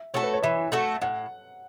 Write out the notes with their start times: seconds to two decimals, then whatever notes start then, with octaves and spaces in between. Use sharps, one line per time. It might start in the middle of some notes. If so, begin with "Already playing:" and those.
Already playing: E5
0.14 A3 F#4 A4 C#5
0.23 B4
0.33 C#5
0.43 E3 E5
0.72 A3 F#4 A4
1.02 A2 F#5